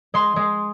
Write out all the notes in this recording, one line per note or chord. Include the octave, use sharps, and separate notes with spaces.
G#3 C6
G#3